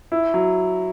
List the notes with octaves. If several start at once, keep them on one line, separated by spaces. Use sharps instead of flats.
E4
F#3